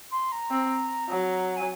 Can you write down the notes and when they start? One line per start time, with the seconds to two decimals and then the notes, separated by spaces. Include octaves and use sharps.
0.12 C6
0.32 A#5
0.51 C4
1.10 F#3
1.56 G#5